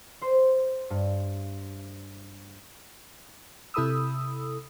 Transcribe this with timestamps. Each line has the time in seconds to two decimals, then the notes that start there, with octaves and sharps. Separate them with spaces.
0.22 C5
0.90 G2
3.74 C3 E4 A4 B5 D#6 E6